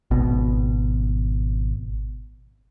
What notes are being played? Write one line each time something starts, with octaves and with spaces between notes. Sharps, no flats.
G#1 B2